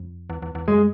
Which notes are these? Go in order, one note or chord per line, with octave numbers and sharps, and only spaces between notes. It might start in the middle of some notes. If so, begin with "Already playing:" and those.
Already playing: F2
E2
E2
E2
F#2 G#3